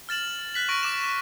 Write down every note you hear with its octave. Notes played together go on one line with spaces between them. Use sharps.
F6 A6 E7 F#7
F#6 B6 F#7
C#6 A#6 D7
D6 E7
F6